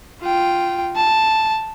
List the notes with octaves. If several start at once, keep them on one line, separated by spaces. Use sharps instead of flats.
F4 G5
A5